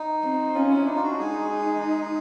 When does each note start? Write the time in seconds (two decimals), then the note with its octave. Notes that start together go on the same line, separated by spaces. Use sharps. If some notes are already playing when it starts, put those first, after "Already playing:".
Already playing: D#4
0.23 C4
0.55 C#4 F4
0.71 E4
0.86 D4 D#4
0.96 F4
1.03 F#4
1.19 G#3 D#4 G#4